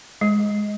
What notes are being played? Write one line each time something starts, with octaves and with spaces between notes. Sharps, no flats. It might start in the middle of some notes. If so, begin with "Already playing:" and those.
G#3